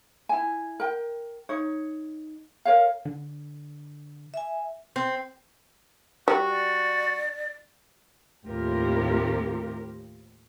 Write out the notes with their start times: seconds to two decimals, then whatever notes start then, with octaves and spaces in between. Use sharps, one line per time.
0.29 E4 G#5
0.80 A#4 G5
1.49 D#4 C#5
2.65 A#4 C#5 F5
3.05 D3
4.34 E5 G#5
4.96 C4
6.28 G3 F#4
6.48 D5
8.46 D#2 A2 C4 F4 G4 A#4